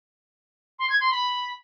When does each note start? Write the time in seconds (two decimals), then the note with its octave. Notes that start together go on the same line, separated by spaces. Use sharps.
0.79 C6
0.90 G#6
1.00 C6
1.11 B5